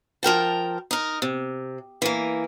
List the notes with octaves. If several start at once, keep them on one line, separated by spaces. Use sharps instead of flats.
F3 A#4 G5 A5
D#4 A#4
C3
E3 A#3